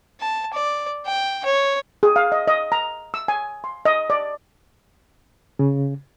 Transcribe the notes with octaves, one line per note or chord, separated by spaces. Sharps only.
A5
D5
G5
C#5
G#4
F5
D#5
D#5
A#5
E6
G#5
C6
D#5
D5
C#3